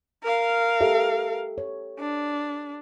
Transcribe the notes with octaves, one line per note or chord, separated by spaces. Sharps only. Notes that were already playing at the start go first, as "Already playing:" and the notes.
A#4 F5
G4 A4 E5
C#5
D4